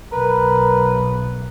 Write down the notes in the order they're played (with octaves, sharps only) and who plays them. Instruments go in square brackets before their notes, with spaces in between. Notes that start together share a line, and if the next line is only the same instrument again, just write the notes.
[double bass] B1 [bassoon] A#4 [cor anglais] B4